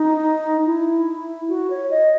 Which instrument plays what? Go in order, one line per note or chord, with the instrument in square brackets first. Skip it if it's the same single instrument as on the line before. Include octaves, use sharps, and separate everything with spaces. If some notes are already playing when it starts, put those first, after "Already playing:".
Already playing: [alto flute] D#4
E4
F#4
C#5
D#5